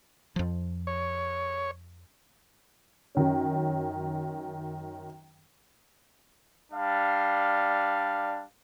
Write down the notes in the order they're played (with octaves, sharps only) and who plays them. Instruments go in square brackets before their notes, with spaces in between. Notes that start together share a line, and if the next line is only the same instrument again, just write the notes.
[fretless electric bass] F2 F3
[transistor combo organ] C#5
[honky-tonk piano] F#2 D#3 C#4
[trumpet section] G3 D4 F5